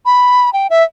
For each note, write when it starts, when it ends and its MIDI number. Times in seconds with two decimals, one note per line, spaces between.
0.05 0.52 83
0.53 0.67 79
0.70 0.83 76